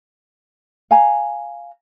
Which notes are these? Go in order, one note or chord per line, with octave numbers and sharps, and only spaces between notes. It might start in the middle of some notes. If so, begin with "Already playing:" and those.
F5 G#5 A#5